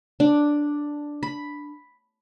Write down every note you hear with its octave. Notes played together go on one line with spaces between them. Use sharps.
D4
B5